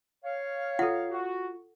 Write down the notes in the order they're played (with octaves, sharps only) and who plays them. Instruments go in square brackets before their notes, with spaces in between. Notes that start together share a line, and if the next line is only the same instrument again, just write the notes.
[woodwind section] C#5 F5
[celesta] F4 [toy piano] A4 F#5
[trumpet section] F#4